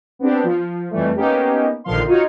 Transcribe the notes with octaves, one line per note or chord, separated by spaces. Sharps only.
B3 C4 D4 G4
F3
F2 E3 G3 A3
A#3 B3 C#4 D#4 G4
A#1 D3 D#3 F3 F5 C6
D#4 F4 F#4 C#5